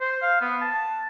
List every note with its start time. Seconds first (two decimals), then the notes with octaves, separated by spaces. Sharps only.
0.01 C5
0.22 F5
0.41 B3
0.61 A5